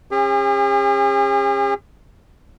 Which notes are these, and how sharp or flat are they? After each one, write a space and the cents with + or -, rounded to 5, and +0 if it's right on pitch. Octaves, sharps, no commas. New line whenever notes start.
C#4 -35 G#4 -45